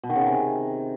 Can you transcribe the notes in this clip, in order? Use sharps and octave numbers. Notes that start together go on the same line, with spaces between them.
B2
D#3
C#3
D#3
C3